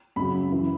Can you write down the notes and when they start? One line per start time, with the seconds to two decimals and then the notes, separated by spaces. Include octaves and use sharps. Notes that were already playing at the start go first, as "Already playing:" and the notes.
0.16 F#2 C#3 F#3 B5
0.52 F#2 E3